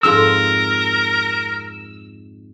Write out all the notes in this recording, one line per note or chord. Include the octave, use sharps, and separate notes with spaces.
F2 G#2 F4 A#4 E6